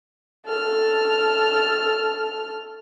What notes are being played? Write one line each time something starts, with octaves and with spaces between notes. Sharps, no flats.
A4 F6